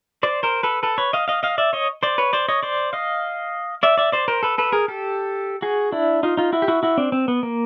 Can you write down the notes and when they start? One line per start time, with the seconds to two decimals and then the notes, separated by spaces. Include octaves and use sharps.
0.23 C5 D5
0.43 A#4 C5
0.63 A4 B4
0.83 A4 B4
0.98 B4 C#5
1.13 D#5 F5
1.28 D#5 F5
1.43 D#5 F5
1.58 D5 E5
1.73 C#5 D#5
2.03 C5 D5
2.18 B4 C#5
2.33 C5 D5
2.49 C#5 D#5
2.63 C5 D5
2.93 D#5 F5
3.83 D5 E5
3.98 D5 E5
4.12 C5 D5
4.28 A#4 C5
4.43 A4 B4
4.58 A4 B4
4.72 G#4 A#4
4.88 G4 A4
5.62 F#4 G#4
5.92 D4 E4
6.23 D#4 F4
6.37 D#4 F4
6.53 E4 F#4
6.62 G4
6.68 E4 F#4
6.83 E4 F#4
6.98 C4 D4
7.12 C4
7.28 B3
7.43 A#3